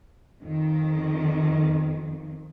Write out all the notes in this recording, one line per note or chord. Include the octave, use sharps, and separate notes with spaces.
F2 D#3